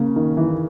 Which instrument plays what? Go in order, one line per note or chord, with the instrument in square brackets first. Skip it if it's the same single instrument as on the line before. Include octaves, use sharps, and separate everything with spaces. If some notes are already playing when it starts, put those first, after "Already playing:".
Already playing: [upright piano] C#3 [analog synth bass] A#3
[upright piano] D#3
E3